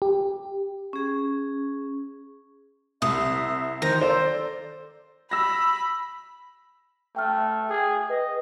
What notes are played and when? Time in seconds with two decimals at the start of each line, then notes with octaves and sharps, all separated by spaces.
0.02 G4
0.93 C#4 G#4
3.02 C2 E5 D#6
3.82 D#3 C5 A#5
4.01 A4 C5 D5
5.31 B5 E6 A#6
7.16 A3 G5 F6
7.69 G#4 G5
8.10 B4 D#5